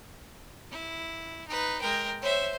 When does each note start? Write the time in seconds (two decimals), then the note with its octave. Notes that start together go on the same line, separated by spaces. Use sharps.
0.72 E4
1.48 D#4 B4
1.81 G#3 A#4 G5
2.22 C5 C#5 E5